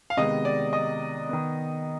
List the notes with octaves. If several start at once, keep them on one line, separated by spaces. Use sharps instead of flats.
F5
C3 D#3 G#3 B3 D#5
D5
D#5
D#3 B3